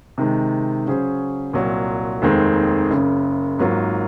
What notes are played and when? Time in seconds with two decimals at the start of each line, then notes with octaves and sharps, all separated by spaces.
0.18 C3 D#3 G#3
0.86 C#3 F#3 C#4 G#4 C5
1.53 C2 A#2 F#3
2.22 F1 D#2 D#3 G#3 C4
2.90 F#1 F#2 C#3
3.59 G#1 G#2 F#3 A#3 F4